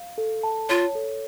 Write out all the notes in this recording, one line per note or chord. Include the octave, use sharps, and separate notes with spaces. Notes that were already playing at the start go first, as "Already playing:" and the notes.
Already playing: F5
A4
A5
F4 C#5
A4